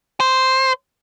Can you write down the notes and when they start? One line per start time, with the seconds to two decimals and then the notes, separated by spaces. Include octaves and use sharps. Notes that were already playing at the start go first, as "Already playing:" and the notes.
0.20 C5